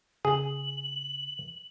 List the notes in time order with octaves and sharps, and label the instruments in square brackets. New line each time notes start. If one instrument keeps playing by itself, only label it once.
[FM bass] C#3 [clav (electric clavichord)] G#4 [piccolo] F#7